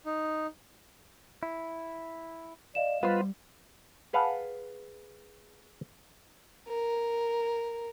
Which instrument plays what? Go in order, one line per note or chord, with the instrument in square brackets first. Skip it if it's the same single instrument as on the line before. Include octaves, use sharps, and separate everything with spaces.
[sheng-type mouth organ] D#4
[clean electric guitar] E4
[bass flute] D5 [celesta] D#5 F5 E7
[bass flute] G3 [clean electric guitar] B3 C5 [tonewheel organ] F4 B4
[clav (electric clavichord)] G#4 B4 F5 F#5 A5
[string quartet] A#4